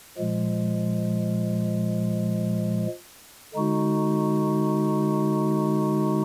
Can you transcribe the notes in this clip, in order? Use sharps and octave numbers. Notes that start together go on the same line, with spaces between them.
A#2 F3 G#3
D3 G#3 D#4 F#4